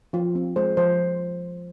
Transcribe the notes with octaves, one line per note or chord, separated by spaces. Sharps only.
F3 F4
C4
G#3 C5
F3 C5